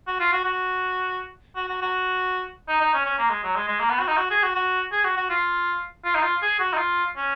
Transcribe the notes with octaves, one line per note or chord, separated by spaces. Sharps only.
F#4
F4
F#4
F#4
F#4
F#4
F#4
D#4
D#4
C#4
C#4
A#3
G#3
F#3
G#3
G#3
A#3
B3
F#4
D#4
F#4
G#4
F#4
F#4
G#4
F#4
F#4
F4
F4
D#4
F4
G#4
F#4
D#4
F4
C#4